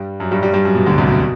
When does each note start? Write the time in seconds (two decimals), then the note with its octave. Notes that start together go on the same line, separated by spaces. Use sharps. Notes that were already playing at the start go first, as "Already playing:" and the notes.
Already playing: G2 G3
0.20 F#2 F#3
0.31 G2 G3
0.42 G2 G3
0.54 G2 G3
0.65 F#2 F#3
0.75 B2
0.86 D2 D3
0.98 C2 C3
1.08 B2